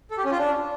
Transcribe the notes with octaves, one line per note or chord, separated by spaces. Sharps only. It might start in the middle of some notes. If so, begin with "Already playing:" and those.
A4
G4
C#4
F4
D4